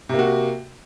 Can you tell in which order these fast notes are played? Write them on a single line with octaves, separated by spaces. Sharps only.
C3 A#3 F#4